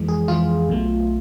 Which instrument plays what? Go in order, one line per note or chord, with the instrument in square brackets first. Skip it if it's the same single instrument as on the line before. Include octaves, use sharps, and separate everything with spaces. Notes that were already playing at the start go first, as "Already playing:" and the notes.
Already playing: [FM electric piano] F2 E3 G#3
G#4
F2 E3 G#3 F4
B1 B2 A3